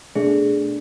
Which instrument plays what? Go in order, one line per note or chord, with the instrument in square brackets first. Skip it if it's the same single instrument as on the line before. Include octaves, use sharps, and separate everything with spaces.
[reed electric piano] B2 A3 D4 [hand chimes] G#4